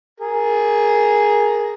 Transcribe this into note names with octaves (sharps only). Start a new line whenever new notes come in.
G#4 A#4